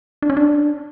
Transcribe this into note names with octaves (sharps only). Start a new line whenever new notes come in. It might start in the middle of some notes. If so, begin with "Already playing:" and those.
D4
C#4
D4